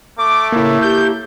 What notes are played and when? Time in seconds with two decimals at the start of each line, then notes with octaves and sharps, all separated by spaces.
0.19 A3 D6
0.52 A2 C#3 A#3 E4
0.82 G4 G6